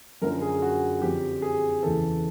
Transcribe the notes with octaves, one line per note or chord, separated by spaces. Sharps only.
F#2 D3 F3 A#4
G#4
F#4
F2 D3 F3 G4
G#4
E2 C#3 E3 A4